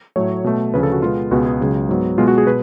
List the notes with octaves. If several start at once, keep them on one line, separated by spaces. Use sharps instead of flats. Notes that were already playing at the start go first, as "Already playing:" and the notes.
A2 F#3 A3 C#5
B2 A3
D2 C#3 F3 B4
A4
F#4
B2 G#3 B3 F4
C#2 B2 G#3 B3 F#4
G#4
C#2 C#3 F#3
G#2 F#3 B3
B2 G#3 B3 F4
F#4
G#4
B2 B4